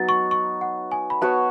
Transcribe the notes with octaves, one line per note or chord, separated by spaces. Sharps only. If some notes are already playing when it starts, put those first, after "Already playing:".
Already playing: F#3 B3 D#4 A6
C#6
C#6
F#5
G#5
B5
B3 F#4 C#5 A5